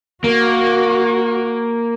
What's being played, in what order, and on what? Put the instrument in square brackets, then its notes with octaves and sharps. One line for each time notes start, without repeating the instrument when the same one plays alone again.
[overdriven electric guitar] A#3 [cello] F#4